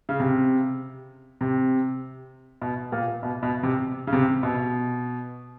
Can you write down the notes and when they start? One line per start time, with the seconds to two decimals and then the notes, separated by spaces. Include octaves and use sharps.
0.09 C#3
0.20 C3
1.41 C3
2.61 B2
2.92 A#2
3.23 B2
3.43 B2
3.63 C3
4.07 C#3
4.13 C3
4.43 B2